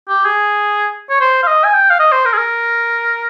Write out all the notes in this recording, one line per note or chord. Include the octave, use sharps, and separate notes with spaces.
G4
G#4
C#5
C5
F5
D#5
G#5
G5
F5
D#5
C5
A#4
G#4
A#4